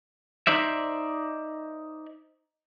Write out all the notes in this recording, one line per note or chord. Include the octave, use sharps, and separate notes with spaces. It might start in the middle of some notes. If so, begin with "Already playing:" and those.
D#4 C5 D5 E5